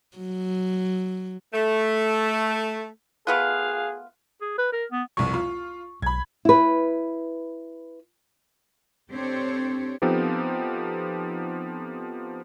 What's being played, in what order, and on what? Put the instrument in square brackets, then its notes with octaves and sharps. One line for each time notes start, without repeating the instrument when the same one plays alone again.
[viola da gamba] F#3
[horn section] A3
[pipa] A3 B3 F4 [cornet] G#4 [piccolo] F5 [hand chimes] F#6
[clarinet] G#4
B4
A#4
B3
[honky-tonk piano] F1 C2 [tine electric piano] C#6
[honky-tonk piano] F4
[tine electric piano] B1 [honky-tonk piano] B5 G#6
[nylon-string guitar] E4 B4
[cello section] C4 D4 G4 A4 C5 C#5
[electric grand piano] F3 B3 C4 D#4 G4 A4